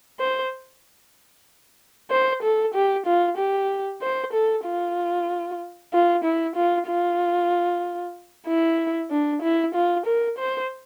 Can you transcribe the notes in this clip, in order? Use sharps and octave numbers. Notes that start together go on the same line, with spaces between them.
C5
C5
A4
G4
F4
G4
C5
A4
F4
F4
E4
F4
F4
E4
D4
E4
F4
A#4
C5